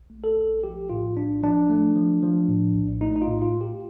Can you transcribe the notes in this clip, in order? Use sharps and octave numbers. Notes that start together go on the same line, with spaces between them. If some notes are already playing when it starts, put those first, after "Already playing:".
Already playing: A#1
A3
A4
A#1
F3 G4
A2 F4
A#1 D4
F3 D4
A3
F3
F3
A2
A#1
A3 D#4
D#4
F4
A2
F4
A3
G4